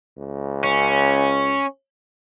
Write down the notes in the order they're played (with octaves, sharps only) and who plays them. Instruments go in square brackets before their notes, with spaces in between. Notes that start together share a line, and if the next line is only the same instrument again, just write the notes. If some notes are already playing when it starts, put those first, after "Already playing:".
[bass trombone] C#2
[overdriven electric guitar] C#4